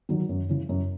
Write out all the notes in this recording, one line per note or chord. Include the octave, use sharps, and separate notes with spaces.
D#3 F#3
F#2
C#3 E3
F#2